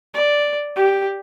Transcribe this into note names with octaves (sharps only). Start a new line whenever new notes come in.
D5
G4